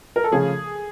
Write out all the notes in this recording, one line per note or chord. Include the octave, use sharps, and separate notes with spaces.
A#4
A4
C#3 F3 A3 C#4 G#4